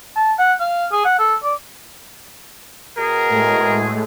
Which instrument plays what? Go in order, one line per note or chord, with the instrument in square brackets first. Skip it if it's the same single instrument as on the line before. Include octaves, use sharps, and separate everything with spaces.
[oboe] A5
F#5
F5
G#4
F#5
A4
D5
[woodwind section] B2 G#4 [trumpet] A#4
[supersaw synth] A2 G#3 A3